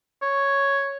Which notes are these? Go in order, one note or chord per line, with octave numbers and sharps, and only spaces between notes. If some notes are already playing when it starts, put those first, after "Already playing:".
C#5